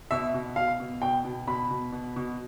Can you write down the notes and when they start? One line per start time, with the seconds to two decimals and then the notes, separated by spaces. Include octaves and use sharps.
0.11 B2 E5
0.34 B2
0.56 B2 F5
0.80 B2
1.02 B2 G5
1.25 B2
1.48 B2 B5
1.71 B2
1.92 B2
2.16 B2